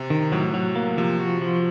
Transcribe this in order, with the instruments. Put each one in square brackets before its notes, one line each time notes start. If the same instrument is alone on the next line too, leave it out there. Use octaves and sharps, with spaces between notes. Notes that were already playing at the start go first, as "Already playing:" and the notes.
Already playing: [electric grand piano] C3
[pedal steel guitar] D#3
[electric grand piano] A2 [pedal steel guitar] F#3
[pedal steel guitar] F#3
A#3
[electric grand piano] C3 [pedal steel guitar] F3
[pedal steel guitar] F#4
F3